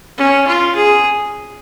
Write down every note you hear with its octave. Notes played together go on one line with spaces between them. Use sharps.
C#4
F4
G#4